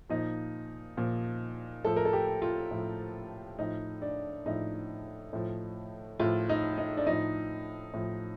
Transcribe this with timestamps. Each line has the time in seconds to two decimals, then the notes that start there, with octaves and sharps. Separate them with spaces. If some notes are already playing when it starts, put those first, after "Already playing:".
0.09 A#2 F3 D#4
0.97 A#2 F3
1.84 A2 F3 A4
1.96 A#4
2.05 A4
2.13 G4
2.42 F4
2.71 A2 F3
3.59 A2 F3 D#4
4.02 D4
4.46 A2 F3 D#4
5.33 A2 F3
6.20 A2 F3 F4
6.49 D#4
6.78 D#4
6.97 D4
7.07 A2 F3 D#4
7.94 A2 F3